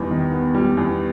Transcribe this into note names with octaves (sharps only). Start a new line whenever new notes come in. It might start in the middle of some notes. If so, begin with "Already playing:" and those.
Already playing: E2 D#3 G3 B3
D#3
B3
G3
E2